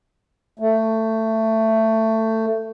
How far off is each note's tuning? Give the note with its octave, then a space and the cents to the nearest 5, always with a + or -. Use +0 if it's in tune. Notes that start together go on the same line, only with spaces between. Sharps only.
A3 +15